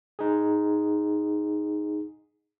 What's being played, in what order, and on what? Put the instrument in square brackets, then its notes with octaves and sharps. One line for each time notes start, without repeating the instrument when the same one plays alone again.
[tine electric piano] D#4 G#4